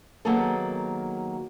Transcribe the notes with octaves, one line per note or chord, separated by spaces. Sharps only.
D#3 F#3 A#3 B3 G#4 A4